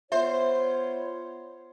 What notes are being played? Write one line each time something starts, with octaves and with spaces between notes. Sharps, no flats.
B3 F4 C5 C#5 E5